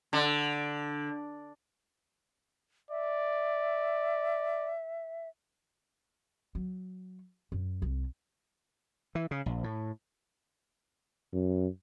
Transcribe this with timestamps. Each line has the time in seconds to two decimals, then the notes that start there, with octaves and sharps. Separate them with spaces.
0.13 D3
2.91 D5 E5
6.55 F#3
7.52 F#2
7.82 C2
9.15 E3
9.31 C#3
9.46 A#1
9.64 A2
11.33 F#2